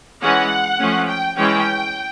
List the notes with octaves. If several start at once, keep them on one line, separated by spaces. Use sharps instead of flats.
E3 G#3 C#4 F#5
F3 A3 C#4
G5
E3 G#3 C#4 G5